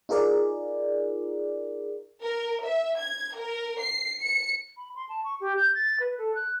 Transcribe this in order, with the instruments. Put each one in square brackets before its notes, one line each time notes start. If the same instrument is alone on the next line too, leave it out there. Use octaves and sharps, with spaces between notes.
[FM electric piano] D#4 F4 G#4 A#4 D5
[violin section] A#4
E5
G#6
A#4
C7
C#7
[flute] B5
C6
A5
C#6
G4
G6
A6
B4
A4
F#6